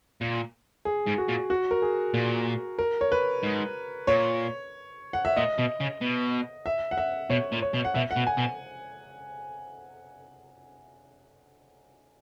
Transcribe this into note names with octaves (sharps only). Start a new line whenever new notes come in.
A#2
G#4
G#2
F#4
A#2
F#4
A#4
G#4
A#2
A#4
C#5
B4
G#2
A#2 C#5
F#5
E5
A#2 D#5
B2
C#3
B2
E5
F#5
E5
B2 C#5
A#2
C#5
B2
F#5
B2 E5
F#5
B2
G#5
B2